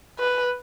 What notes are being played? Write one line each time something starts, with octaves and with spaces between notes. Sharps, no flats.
B4